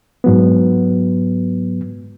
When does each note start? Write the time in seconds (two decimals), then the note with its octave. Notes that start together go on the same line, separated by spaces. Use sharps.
0.24 G#2 F#3 B3